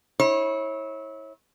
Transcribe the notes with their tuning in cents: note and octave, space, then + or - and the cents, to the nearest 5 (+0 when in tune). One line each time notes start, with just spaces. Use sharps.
E4 -25 C#5 -30